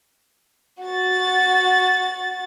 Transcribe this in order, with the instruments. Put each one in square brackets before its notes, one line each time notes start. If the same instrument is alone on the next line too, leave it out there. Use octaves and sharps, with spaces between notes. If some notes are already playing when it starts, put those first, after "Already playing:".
[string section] F#4 A6